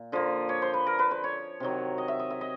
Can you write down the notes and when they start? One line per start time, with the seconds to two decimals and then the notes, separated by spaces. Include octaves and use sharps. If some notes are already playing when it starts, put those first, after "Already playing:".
Already playing: A#2
0.12 D3 F3 A#3
0.49 C#5
0.62 C5
0.74 B4
0.87 A#4
0.99 B4
1.11 C5
1.24 C#5
1.60 C3 D#3 F#3
1.98 D#5
2.08 E5
2.19 D#5
2.30 E5
2.41 D#5